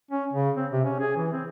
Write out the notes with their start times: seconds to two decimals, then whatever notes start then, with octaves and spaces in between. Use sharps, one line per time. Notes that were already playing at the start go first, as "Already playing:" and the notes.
0.11 C#4
0.33 C#3
0.57 C4
0.72 C3
0.85 C#4
1.00 G#4
1.17 E3
1.32 C4